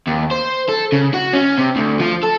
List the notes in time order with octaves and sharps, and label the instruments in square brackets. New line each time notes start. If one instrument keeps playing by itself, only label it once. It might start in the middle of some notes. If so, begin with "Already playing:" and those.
[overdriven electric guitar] D#2
C5
A4
C#3
F#4
C#4
C3
D2
F3
A4